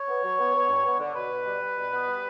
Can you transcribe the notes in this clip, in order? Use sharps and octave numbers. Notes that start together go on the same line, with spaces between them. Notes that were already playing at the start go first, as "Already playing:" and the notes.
Already playing: C#5
B3
F#3
B3
B3
G2
B3
D3
B2 B4
B2
G3
G3
B2
B3
G3